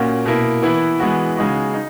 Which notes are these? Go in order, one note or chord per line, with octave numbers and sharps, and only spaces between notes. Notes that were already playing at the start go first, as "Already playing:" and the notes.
Already playing: A#2 A#3 C#4 F#4
B2 A#3 E4
E3 B3 E4
E3 G#3 B3 F#4
C#3 G#3 D#4 F#4
D#4